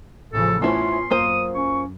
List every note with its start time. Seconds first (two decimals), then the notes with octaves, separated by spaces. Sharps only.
0.33 A1 C#3 F3 A4
0.62 A3 B3 C#4 E4 F4 C5 C6
1.10 F#2 A#3 F4 C5 D#6
1.55 C#4 C#6